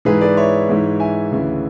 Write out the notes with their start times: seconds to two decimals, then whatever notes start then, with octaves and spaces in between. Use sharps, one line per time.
0.05 G#2 E3 G#4 B4
0.21 B4 D5
0.37 C#5 E5
0.69 G#2 E3
1.00 E5 G#5
1.31 D2 C#3 E3